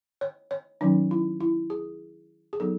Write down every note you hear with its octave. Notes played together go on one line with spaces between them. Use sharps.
C#5
C#5
D#3 F#3 C#4 D#4
E4
E4
G#4
G#4
F#3 B3 D#4 A4